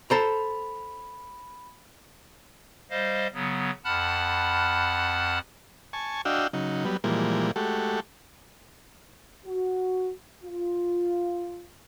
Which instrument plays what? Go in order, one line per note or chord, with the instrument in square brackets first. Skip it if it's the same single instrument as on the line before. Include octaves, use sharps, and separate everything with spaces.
[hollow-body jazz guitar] A4 C5 A#5 [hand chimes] B5
[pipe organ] G3 C5 D#5 F5
C#3 F#3 B3
F2 F#5 A5 B5 F6 F#6
[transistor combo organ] G#5 A5 C#6
D4 F#4 D#5 F5 G5 E6
C#3 F#3 D#4
F#3 G3 B3
A#2 E3 F3 G3 G#3 A#3
G#3 A3 F#4 G4 A4
[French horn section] F#4
F4